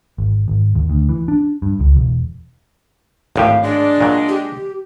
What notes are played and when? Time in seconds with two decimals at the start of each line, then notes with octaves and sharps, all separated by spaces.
0.18 G#1
0.48 G#1
0.75 D#2
0.90 D2
1.09 E3
1.28 D4
1.62 G2
1.80 C#2
1.97 E1
3.36 G#1 A2 G4 F5
3.64 G#3 D4 D5
4.01 A#2 F#3
4.28 G4